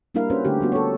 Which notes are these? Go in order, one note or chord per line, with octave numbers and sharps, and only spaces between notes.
G3 A#3 D4 E4 A#4 F5
C#4 F#4 B4 C5
D3 A3 E4 G4
G3 B3 F#4
A4 C#5